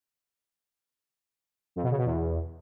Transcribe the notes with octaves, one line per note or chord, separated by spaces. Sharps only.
F2
B2
C#3
B2
E2